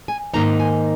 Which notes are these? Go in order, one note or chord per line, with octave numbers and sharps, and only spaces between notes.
G#5
G#2 D#3 A#3 D#4 A#5
G#5